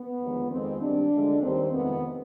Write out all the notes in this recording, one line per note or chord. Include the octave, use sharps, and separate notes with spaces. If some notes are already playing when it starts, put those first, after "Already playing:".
Already playing: B3
D#2 D3 F3 G#3
F2 D#3 G#3 C4
G2 D#3 G3 D4
D2 D3 F3 G#3
D#2 D#3 G3 C4
F2 C3 D#3 G#3 B3